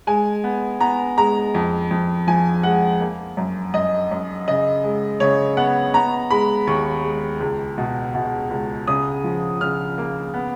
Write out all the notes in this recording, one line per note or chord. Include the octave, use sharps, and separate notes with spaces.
G#3 G#5
B3
B3 A#5
G#3 A#5
F2
F2
F3 G#5
G#3 F#5
A#3
F#2
F#2 D#5
F#2
C#3 D#5
G#3
C#3 C#5
B3 F#5
B3 A#5
G#3 B5
D#2 C#6
G#3
C#2
B2
B2
C#2
C#3 D#6
F3
C#3 F6
A#3
B3